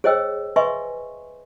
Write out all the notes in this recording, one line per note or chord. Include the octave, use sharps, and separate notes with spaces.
G#4 C5 C#5 D#5 G5 E6
B4 D#5 E5 G#5 C6 C#6